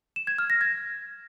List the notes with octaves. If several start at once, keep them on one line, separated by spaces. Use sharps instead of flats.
E7
G#6
F6
A#6
G#6